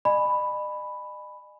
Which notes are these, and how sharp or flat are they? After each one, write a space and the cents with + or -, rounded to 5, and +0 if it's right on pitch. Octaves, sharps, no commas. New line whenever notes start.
D#5 -45 G#5 +5 B5 +0